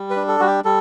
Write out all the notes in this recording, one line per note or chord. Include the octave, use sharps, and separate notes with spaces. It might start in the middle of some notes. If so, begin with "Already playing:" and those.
Already playing: G3
B4
D4
A4
G3 F#4
G4
G3 A4